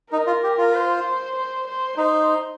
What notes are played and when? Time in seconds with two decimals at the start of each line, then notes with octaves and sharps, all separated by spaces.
0.12 D#4 A#4
0.27 F4
0.43 G4
0.58 F4
0.74 C5
1.36 C5
1.67 C5
1.97 D#4 C5